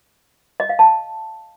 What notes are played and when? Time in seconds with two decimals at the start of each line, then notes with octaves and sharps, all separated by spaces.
0.60 D#5
0.69 F5
0.79 A5